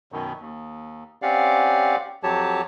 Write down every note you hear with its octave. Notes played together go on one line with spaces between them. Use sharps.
F#2 B2 D#3
D#2
C4 C#4 G4 D5 F5 F#5
F2 F#3 G4 C#5 A5